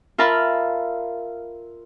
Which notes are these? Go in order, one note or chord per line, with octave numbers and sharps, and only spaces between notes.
F4 A#4 E5 A5 B5 F6